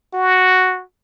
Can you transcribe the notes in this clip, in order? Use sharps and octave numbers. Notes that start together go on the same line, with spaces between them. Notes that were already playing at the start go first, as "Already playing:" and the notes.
F#4